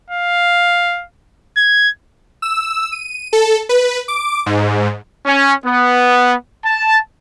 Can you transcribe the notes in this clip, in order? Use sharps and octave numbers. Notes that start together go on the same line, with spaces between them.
F5
G#6
E6
D#7
A4
B4
D6
G#2
C#4
B3
A5